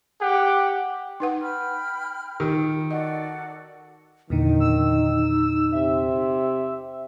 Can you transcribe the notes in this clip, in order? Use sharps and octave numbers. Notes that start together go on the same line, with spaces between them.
G4 F#5
D#4 B4 F#5
G5 B5 F6
D#3 F4 G4
F#4 A4 D5 D#5
E2 A#2 D3 D#3 D#4
E6
C3 E5